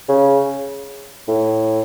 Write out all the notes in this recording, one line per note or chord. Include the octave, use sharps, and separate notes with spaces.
C#3
A2